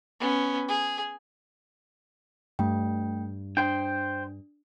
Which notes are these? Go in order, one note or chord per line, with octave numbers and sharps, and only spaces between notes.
B3 C#4
G#4
G2 A3 G5
D4 C5 G5